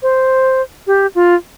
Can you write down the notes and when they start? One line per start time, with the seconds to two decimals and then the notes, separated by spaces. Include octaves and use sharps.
0.02 C5
0.87 G4
1.15 F4